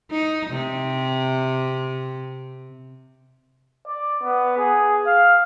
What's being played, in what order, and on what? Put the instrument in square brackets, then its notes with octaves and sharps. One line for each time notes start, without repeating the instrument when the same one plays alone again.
[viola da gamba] D#4
C3
[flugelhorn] D5
B3
G#4
F5